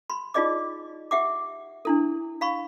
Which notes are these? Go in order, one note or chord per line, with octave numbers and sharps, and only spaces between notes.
B5 C6
D#4 F4 G#4 D5 D#5 D6
G4 E5 F#5 D6
D4 E4 A4
F5 B5 C#6